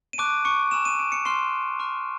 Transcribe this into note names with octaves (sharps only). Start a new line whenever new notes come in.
D#7
A5 C#6 D6 F#6 D7
C#6 C#7
G#5 B5 E6 E7
D#7
D7
C#7
C6 F6 C7
A#5 C#6 F6